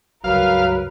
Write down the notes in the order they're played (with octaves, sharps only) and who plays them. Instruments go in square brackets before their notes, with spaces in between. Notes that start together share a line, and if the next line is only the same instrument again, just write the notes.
[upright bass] C#2 G2 [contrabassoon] F#3 [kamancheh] A#4 B4 [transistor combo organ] F5